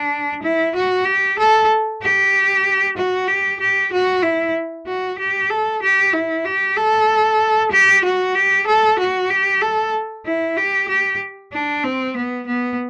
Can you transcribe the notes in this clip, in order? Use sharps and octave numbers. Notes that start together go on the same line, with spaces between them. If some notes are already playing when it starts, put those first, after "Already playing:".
Already playing: D4
E4
F#4
G4
A4
G4
F#4
G4
G4
F#4
E4
F#4
G4
A4
G4
E4
G4
A4
G4
F#4
G4
A4
F#4
G4
A4
E4
G4
G4
D4
C4
B3
B3